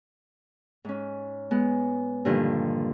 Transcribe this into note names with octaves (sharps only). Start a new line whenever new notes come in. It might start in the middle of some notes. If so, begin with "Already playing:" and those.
G#2 C#4
G#3 B3
G2 A#2 D3 D#3 F3